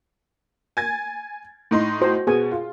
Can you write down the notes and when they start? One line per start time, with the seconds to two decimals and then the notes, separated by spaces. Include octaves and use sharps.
0.77 G#5 G#6 A6
1.71 A2 D#4 C6
2.01 F#4 C5
2.27 B2 B3 G#4 G#5
2.52 F4